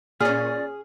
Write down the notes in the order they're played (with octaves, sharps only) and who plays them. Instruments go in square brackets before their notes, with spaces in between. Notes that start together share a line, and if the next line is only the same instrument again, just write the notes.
[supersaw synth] A#2 C#4 [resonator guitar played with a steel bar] G#4 [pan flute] D5 [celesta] F6